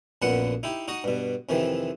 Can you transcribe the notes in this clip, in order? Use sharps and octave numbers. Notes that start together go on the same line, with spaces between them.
A#1 F#2 A#2 B3 F#5
D#4 E4 G4
D#4 F#4 D#5
G2 B2
F2 C3 D#3 E3